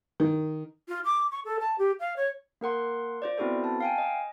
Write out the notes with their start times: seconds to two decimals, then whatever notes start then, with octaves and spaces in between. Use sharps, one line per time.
0.20 D#3
0.88 F4
1.04 D6
1.32 C#6
1.45 A4
1.60 A5
1.78 G4
2.00 F5
2.17 C#5
2.61 A#3 A#4 F#5 C6
3.22 F4 C5 D5
3.38 B3 C4 E4 F#4 A4 C5
3.64 A5
3.80 F5 G5 G#5
3.98 D#5